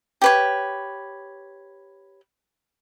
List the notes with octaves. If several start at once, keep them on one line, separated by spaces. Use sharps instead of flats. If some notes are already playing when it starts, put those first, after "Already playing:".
G4 B4 C#5